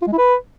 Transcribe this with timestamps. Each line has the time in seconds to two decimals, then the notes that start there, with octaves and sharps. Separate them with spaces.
0.02 F4
0.07 G#3
0.13 E4
0.18 B4